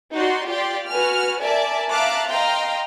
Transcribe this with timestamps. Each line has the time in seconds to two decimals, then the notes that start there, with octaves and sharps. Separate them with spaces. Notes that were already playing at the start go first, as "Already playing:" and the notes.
0.14 D#4 F#4 D5 C6
0.47 F4 G4 D5 C6
0.88 F#4 B4 G#5 F6
1.42 A#4 D5 E5 G#5 A5
1.90 E5 F5 A5 A#5 D6 F#6
2.29 D#5 F5 G5 A#5 C6